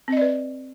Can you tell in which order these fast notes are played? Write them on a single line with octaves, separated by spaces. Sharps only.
C4 D#5 D5 B4